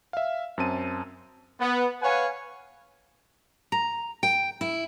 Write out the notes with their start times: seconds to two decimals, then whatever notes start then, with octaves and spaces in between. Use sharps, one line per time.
0.13 E5 F5
0.58 F#2 C4 A5 D#7
1.60 B3
2.02 B4 C#5 F5 F#5 G#5
3.72 A#5
4.23 G5
4.61 E4